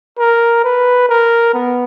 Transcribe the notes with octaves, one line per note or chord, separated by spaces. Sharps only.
A#4
B4
A#4
B3